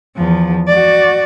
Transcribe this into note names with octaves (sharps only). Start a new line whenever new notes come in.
E2 F3
F#4 D5